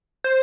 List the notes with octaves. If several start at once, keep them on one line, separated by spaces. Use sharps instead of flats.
C5